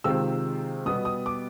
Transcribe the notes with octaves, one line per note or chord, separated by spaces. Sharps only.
C3 D#3 G#3 C4 F4 E6
B2 G3 B3 D#6
D#6
D6